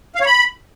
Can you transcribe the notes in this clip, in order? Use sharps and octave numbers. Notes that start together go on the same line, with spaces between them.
F5
C#5
B5